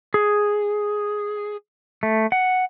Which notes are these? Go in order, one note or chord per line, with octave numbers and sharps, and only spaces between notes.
G#4
A3
F#5